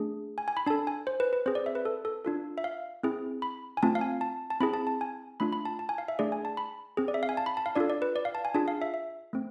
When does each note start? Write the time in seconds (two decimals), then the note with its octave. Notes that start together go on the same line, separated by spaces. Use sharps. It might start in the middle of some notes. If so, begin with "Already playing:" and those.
Already playing: A3 D4 G#4
0.38 G#5
0.48 G#5
0.57 B5
0.66 D4 A4 A5
0.87 G#5
1.07 C5
1.20 B4
1.33 B4
1.46 C4 G#4 C5
1.55 D5
1.66 E5
1.75 B4
1.85 A4
2.05 A4
2.25 D4 F4 A4
2.58 E5
2.64 F5
3.03 C4 E4 G#4
3.42 B5
3.77 G#5
3.83 A3 C4 F4 A5
3.95 F5
4.01 G#5
4.21 A5
4.50 A5
4.60 C4 E4 G#4 B5
4.74 A5
4.87 A5
5.01 G#5
5.40 A3 D4 F4 B5
5.53 B5
5.65 A5
5.79 A5
5.89 G#5
5.98 F5
6.08 E5
6.19 A3 D4 G#4 D5
6.32 G#5
6.45 A5
6.57 B5
6.97 C4 G#4
7.08 D5
7.14 E5
7.23 F5
7.29 G#5
7.37 A5
7.46 B5
7.57 A5
7.66 F5
7.76 D4 F4 A4 D5
7.90 D5
8.02 B4
8.16 D5
8.25 F5
8.35 A5
8.45 G#5
8.55 D4 F4 G#4 A5
8.68 F5
8.82 E5
8.94 E5
9.33 A3 C4